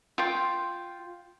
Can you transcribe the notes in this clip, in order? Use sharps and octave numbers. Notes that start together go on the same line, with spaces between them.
F4 G5